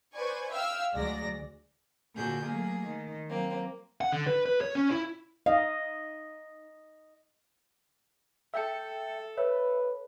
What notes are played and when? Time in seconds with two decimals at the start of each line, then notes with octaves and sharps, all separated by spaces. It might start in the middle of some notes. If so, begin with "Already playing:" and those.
0.13 B4 C5 D5 G#5 C#6
0.50 E5 F5 G5 E6 F6
0.94 D2 F#3 G#3 D5 A#6
2.14 A#2 D3 F#4 G#4 G6
2.44 F#3 A3 A#3 G#4
2.86 D#3
3.28 F#3 A#3 C4
4.01 F#5
4.13 D3
4.27 B4
4.46 B4
4.61 C#5
4.75 C#4
4.91 E4
5.46 D#4 D#5 F5
8.54 A4 E5 G5 C#7
9.38 B4 C#5 E5